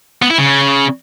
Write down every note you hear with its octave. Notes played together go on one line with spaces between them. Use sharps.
B3
E4
C#3